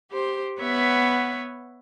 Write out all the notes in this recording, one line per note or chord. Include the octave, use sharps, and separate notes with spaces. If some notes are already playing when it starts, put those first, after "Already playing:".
G4 C5 C6
B3 B4 C#5 E5 F#5